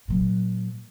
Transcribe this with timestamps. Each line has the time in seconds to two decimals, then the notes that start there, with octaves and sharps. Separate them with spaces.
0.08 A#2 F#3